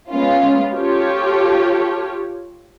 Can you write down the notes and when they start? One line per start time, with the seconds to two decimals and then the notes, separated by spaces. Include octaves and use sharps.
0.10 G#3 B3 C#4 F4
0.73 F4 G4 A4 C#5